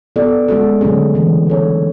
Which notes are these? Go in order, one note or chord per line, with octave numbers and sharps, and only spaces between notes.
B3 F#4 A4 D5
G#3 C#4 F#4 A4
D3 F#3 A3 C#4 G#4
C#3 E3 A3 C#4
G#3 D4 A4 C#5